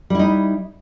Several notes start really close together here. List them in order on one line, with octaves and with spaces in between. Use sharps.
G3 E4 D#4